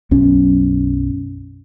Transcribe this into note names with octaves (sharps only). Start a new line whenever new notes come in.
B1 F#2 C#4